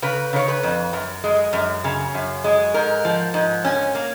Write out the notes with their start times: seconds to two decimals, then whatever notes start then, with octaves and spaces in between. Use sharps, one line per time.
0.02 C#3 B4
0.33 C#3 C#5
0.48 B4
0.63 F2
0.93 F#2
1.24 G#3
1.53 F#2
1.84 C#3
2.14 F#2
2.44 G#3
2.74 G#2 A#4
3.04 F3
3.34 G#2
3.65 C#4
3.95 A#3